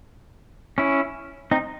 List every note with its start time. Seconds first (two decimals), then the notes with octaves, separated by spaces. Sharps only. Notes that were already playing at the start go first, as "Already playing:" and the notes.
0.78 C#4 E4
1.51 C4 D#4